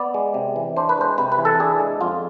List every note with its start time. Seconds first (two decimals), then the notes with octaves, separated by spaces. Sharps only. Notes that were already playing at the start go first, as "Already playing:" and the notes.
Already playing: B3 D5
0.14 G#3
0.34 C3
0.56 E3
0.77 D4 C5
0.89 B4
0.98 G#3 C5
1.18 C3 B4
1.32 B4
1.38 E3
1.45 A4
1.60 D4 G#4
1.80 G#3
2.01 F2 F4